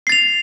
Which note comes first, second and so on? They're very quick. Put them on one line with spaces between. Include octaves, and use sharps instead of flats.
C7 A6 F7